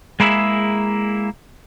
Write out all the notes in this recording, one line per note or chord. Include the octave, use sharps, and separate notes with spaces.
G#3 A#3 E4 G#4 E5